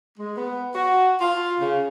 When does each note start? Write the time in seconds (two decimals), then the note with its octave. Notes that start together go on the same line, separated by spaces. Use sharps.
0.19 G#3
0.36 B3
0.75 F#4
1.20 F4
1.60 C#3